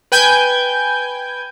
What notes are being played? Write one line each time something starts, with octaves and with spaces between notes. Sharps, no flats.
B4 G5 G#5 G6 G#6